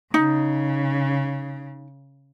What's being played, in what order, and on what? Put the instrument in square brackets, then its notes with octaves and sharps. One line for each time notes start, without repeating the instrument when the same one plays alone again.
[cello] C#3 [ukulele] D#4